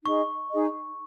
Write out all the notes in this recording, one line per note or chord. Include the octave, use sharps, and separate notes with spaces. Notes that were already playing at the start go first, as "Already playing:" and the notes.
D#4 G#4 D#5 C#6
D#4 G#4 D#5